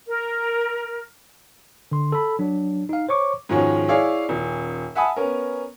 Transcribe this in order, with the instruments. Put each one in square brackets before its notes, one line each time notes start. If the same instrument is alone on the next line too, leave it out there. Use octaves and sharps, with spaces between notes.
[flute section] A#4
[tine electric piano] D3 C6
A4 B5
F#3 D4
D#4 F5
C5 C#5 C#6 D6
[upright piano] G#2 D#3 F3 G#3 C#4 F#4
E4 G#4 C#5 D5 F5
D#1
E5 F#5 G#5 A5 B5 D#6
B3 C#4 A#4